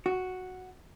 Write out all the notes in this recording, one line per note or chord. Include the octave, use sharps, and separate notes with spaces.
F#4